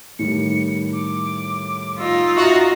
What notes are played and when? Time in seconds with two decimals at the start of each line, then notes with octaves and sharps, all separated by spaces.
0.19 A2 D#3 G3 C#7
0.93 D6
1.98 D#4 F4 E6
2.37 F#4 E5 F5 A#5